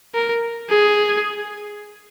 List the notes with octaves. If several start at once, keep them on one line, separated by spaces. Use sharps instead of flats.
A#4
G#4